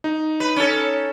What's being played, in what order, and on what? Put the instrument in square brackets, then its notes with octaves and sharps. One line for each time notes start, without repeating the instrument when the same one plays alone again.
[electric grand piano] D#4
[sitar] B4
C#4 A4